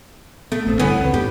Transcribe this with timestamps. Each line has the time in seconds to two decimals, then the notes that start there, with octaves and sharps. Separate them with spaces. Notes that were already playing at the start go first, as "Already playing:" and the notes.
0.52 A3 B3
0.67 A1 B3 C4
0.80 G2 D3 E3 B3 C#4
0.99 C#2 C4
1.14 G#2 G4